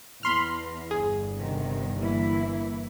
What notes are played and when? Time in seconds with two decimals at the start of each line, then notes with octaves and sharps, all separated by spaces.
0.23 E2 B5 C6 F6
0.91 G1 G#4
1.37 C3 D#3
1.98 E3 A#3 E4